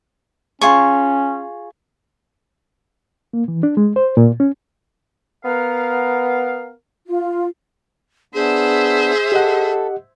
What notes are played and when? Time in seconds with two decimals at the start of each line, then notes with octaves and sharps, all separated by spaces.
0.61 C#4 F4 G#4 C#6
3.33 A#3
3.48 E3
3.63 D4
3.77 G#3
3.96 C5
4.17 A#2
4.40 C#4
5.45 B3 A#4 F5
7.07 F4
8.34 B3 D4 G#4 C5 E5
9.32 G4 A4 D#5 F#5